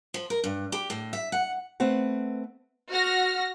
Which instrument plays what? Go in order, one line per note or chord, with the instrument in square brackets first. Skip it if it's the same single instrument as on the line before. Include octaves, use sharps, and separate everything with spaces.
[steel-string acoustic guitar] F3
A#4
G2
G4
A2
E5
F#5
A3 C4 B4 F#5
[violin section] F#4 F6 A#6